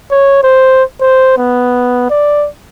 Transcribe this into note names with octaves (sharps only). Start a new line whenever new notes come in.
C#5
C5
C5
B3
D5